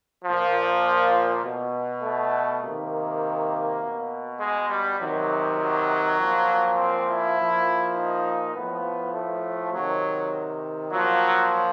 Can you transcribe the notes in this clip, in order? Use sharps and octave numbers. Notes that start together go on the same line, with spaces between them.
F3
A#2
B2
A3
C3 D#3 A#3
B2
G#3
G3
C3 D#3 F#3
F#3
A#2 F3
C4
E4
A#2 F3
D#4
A2 F3 B3
A3
C3 D#3 F#3
A#2 F3 F#3